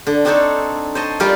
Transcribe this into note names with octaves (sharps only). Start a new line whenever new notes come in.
D3
C4 D4 D#4 A4 C5 C#5
C5 C#5 D#5 A5
G3 F4 G4 A#4 D5 F5